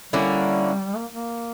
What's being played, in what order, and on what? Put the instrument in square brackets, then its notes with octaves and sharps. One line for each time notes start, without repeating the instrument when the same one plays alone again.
[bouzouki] D3 A#3 C#4 E4 [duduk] G3
[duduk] A#3
A#3